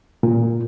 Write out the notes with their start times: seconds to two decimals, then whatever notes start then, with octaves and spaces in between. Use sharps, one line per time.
0.23 A#2